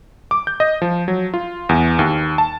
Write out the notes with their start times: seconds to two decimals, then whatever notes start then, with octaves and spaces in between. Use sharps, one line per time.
0.31 D6
0.47 G6
0.60 D#5
0.82 F3
1.08 F#3
1.34 F4
1.69 E2
1.99 D#2
2.38 A5